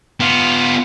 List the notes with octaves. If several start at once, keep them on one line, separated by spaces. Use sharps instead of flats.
B3 F4